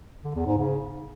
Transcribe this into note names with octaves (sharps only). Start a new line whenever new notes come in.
D3
E2
G#2
C#3